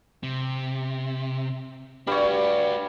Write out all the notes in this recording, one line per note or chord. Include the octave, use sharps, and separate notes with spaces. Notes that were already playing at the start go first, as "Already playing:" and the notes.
C3
G2 G3 D4 F#4 C#5